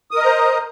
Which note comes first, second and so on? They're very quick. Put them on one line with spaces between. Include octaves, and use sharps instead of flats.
D#6 A#4 D#5 A#5 C5